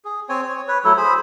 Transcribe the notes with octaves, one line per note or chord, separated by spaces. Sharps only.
G#4
C4 C#5 G#5
C#5
B4 C#5
F#3 A3 E4 A4
G#4 C5 B5